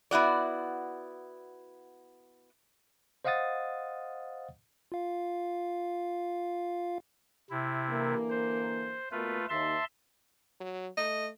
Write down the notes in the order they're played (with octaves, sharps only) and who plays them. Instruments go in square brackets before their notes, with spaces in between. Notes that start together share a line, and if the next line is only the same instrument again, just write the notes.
[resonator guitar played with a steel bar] B3 E4 F#4 D5
[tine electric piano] C5 D#5 F5 F#5 D#6 A6
[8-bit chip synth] F4 F5
[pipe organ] C3 E4
[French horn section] D3 E3 A#3
[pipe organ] C5
[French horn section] B2 A#3 [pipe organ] A3 F4 B4
[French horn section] D#2 [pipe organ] E5 A5 C6
[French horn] F#3
[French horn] A3 [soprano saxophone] D#5